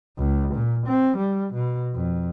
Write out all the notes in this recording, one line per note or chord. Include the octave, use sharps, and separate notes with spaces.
C#2
A#2
C4
G3
B2
F2